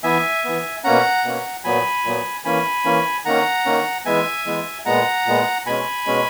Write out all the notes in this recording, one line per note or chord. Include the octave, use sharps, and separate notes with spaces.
E3 B3 E5 G#5
E3 B3
B2 A#3 C#4 F#5 A#5
B2 A#3 C#4
A#2 F#3 B3 G#5 B5
A#2 F#3 B3
E3 A#3 C#4 G#5 B5
E3 A#3 C#4
D#3 A#3 C#4 F#5 A#5
D#3 A#3 C#4
E3 G#3 B3 E5 G#5
E3 G#3 B3
A#2 G#3 B3 F#5 A#5
A#2 G#3 B3
B2 G#3 C#4 G#5 B5
B2 G#3 C#4